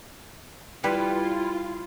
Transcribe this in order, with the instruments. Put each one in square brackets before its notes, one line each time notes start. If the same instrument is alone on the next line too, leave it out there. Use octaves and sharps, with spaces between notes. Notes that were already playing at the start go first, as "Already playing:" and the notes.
[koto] G3 B4 [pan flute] E4 [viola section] F4